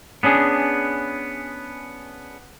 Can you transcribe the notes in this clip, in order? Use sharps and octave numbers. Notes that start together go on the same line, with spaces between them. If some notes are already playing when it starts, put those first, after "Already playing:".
B3 C#4 D4 G#4